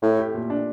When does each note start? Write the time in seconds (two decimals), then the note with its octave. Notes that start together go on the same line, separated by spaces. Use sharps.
0.02 A2 A3
0.19 G4
0.34 A#2
0.50 D4